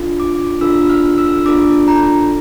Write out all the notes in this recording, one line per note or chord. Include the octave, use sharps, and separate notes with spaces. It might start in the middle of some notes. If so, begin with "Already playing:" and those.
Already playing: D4 F4 A4
D6
D4 F4 A4 E6
F6
E6
D4 F4 A4 D6
A#5